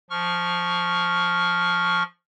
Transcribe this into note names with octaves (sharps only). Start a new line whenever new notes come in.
F3 C#6 F6